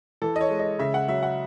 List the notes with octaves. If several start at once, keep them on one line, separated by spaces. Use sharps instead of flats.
E3 A4
D#5
C#5
G#3
D#5
C#3 E5
F#5
F#3 E5
F#5